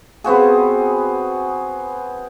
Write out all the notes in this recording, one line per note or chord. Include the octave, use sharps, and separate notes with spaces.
B3 C4 F#4 G#4